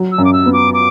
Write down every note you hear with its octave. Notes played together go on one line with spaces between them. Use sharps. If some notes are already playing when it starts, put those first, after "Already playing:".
Already playing: F#3
E6
F#2
D6
E6
B3
D6
D6